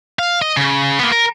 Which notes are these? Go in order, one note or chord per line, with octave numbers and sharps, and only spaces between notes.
F5
D#5
C#3
A#3 B3
A#4